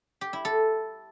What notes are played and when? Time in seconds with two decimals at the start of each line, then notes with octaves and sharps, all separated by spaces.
0.21 G4
0.33 E4
0.45 A4